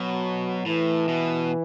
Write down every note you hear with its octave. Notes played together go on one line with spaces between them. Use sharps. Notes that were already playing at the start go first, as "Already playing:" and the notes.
Already playing: B2 F#3
A2 E3
B2